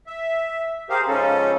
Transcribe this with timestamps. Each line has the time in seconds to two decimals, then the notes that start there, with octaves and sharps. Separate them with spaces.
0.07 E5
0.90 G4 G#4 A#4 C5 F5
1.08 G#2 C#3 F3 C#4 A4